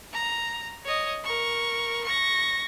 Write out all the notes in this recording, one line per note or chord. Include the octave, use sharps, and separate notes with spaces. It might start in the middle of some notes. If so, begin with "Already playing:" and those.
A#5
C#5 D#5
A#4 C#6
C#6 A#6